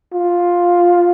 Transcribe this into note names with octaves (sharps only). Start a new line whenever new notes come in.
F4